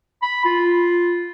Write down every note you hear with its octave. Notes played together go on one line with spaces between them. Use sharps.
B5
F4